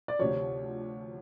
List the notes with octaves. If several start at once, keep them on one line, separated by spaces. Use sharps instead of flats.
D5
D2 C3 F3 C#5